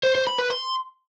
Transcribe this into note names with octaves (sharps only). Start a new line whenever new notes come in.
C5
C5
B5
B4
C6